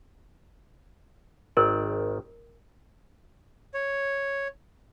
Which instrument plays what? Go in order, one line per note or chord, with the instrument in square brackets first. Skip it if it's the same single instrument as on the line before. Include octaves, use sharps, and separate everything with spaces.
[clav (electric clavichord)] G#1 D#3 D5 [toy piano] A#4
[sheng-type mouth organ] C#5